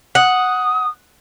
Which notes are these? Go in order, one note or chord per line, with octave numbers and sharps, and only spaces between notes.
F#5 D#6